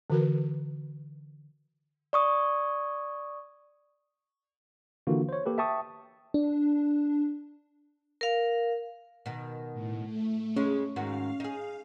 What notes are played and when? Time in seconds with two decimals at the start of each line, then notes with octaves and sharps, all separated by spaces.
0.10 D3 E3 F#4 A#4 B4
2.13 D5 C#6 D#6
5.07 D3 E3 A#3 F4 F#4
5.29 C5 C#5
5.46 A#3 G4 A4 B4
5.58 E5 G5 A5 C#6 D#6
6.34 D4
8.21 A#4 F5
9.26 B2 D#3
9.73 A2
10.04 A3
10.56 C#3 G#3 C#4
10.96 G#2 D#3 F#4 F5
11.40 D#4 G#4